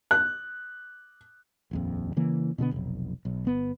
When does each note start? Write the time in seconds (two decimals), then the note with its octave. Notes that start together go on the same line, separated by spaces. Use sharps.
0.11 F#6
1.71 D#1 A#1 F2
2.16 C#3 E3 A#3
2.58 B2 D3 F3 B3
2.72 F1 B1
3.25 B1
3.45 G1 B3